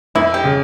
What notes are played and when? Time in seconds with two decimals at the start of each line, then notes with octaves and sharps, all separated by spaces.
0.15 F2 E4
0.34 G4
0.44 C#3